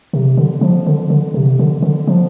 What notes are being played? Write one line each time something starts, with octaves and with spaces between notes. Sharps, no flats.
C3
D3
F3
D3
D3
C3
D3
D3
F3